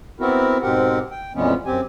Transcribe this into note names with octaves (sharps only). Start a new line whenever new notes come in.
B3 C4 E4 F#4 A#4
G#2 B2 C4 G4 A#4 F#5
G5
F2 A#2 E3 G#3 B3 C#4
F#2 C4 G4 G#5